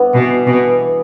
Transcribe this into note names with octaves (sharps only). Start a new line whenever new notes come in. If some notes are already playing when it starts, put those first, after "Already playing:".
Already playing: G2 B3 E4
B2 E3
B2 E3
E3